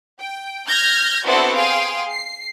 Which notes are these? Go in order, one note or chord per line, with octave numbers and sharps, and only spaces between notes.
G5
F6 G6 G#6 A#6
B3 C4 D4 E4 F#4 A4
G#4 F5 G5 C6
C7